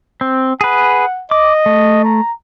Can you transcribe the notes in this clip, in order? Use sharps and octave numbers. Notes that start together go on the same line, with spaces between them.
C4
G#4 B4 F#5
D#5 D6
A3
A#5